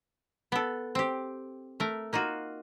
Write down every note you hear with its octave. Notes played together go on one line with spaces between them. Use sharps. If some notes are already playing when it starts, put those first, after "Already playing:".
B3 A4
C4 G4
A3 A#4
A#3 D#4 F4 F#4